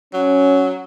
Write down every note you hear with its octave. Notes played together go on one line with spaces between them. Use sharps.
F#3 C#4